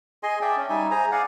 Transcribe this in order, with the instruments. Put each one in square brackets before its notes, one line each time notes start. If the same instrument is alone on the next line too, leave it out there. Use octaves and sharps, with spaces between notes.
[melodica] G#4 D#5 G#5 C6
D5 E5 G5 A5
C#4
G3 D#4 E5 G#5
G#4 C5 G#5 A#5
D5 F5 F#5 G#5